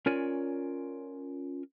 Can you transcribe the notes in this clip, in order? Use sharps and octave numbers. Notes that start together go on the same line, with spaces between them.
C#4 F4 A#4 C#5 D5 G#5